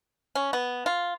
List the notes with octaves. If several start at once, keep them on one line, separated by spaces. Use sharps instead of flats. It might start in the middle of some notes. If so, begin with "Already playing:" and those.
C#4
B3
F4